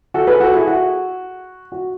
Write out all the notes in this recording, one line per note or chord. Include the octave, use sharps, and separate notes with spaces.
F#4 A4
G#4 B4
F#4 A4
E4 G#4
F#4
F#4